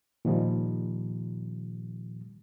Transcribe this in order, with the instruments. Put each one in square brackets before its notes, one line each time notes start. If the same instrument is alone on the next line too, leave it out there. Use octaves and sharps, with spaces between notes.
[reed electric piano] A#2 D#3 F3 G3